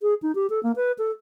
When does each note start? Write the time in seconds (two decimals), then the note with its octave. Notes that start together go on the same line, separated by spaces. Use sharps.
0.02 G#4
0.22 D#4
0.35 G4
0.50 A4
0.63 A#3
0.76 B4
0.98 A4